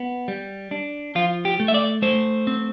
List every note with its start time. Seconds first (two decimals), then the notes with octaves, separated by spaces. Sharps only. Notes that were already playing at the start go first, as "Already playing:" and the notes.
Already playing: B3
0.28 G3
0.71 D4
1.15 F3 F4
1.45 G4
1.60 A3
1.68 E5
1.74 D5
2.02 A3 C5
2.47 C4